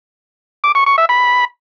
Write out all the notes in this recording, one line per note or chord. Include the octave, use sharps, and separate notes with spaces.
D6
C#6
C#6
E5
B5